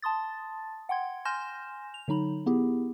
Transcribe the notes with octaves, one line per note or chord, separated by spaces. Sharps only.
A5 C6 D#6 A6
F#5 G5 C6 G#6
G#5 C6 F6 G6 A#6 E7
F7
D3 F#3 D#4 B5
B3 E4 G4 G#4